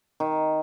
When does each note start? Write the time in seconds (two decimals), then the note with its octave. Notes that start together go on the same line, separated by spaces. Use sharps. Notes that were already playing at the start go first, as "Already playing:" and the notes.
0.20 D#3